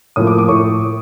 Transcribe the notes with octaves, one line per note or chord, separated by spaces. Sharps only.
A2 F3 A#3 D#6
D6
D6
A2 C#6